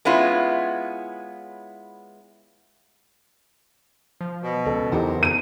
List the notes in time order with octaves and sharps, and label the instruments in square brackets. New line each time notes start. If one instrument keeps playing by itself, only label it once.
[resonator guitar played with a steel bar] G#3 B3 C#4 E4 F4
[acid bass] F3
[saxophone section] B2
[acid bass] C#2 [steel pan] C#3 A4
[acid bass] E2 [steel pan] E3 D#4 G4 [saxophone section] F#3 A#4 C5
[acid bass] F2 [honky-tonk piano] D#7